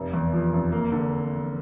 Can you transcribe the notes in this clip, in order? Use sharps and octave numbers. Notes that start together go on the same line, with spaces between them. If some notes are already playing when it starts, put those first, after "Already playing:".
Already playing: F1
E2
F3
F1
A#3
D3